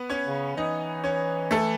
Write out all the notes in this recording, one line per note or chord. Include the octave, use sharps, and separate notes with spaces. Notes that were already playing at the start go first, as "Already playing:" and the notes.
Already playing: B3 B4
C#4 C#5
C#3
E3 D#4 D#5
C#4 C#5
A3 A4